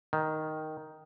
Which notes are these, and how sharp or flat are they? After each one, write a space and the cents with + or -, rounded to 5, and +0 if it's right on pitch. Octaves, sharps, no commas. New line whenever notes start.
D#3 +0